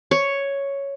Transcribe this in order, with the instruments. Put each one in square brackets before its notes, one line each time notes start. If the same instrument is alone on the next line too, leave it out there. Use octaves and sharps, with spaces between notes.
[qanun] C#5